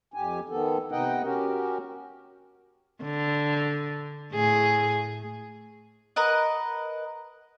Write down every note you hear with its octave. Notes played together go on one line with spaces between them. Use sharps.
F2 G4 G#5
D#3 B3 A4
C3 B3 D#4 D#5 F#5 G5
C#4 F#4 G4 A#4
D3
A2 G#4
A#4 B4 D#5 F#5